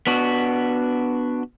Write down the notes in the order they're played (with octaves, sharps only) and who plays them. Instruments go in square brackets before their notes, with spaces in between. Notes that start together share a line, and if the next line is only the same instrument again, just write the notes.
[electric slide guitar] B3 D4 F#4